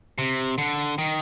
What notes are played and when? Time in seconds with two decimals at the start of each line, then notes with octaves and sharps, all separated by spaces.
0.18 C3
0.58 D3
0.98 D#3